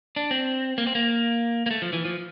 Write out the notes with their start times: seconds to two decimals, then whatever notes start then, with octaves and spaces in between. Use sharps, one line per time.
0.16 D4
0.31 C4
0.78 A#3
0.87 C4
0.95 A#3
1.66 A#3
1.71 A3
1.82 F3
1.93 E3
2.05 F3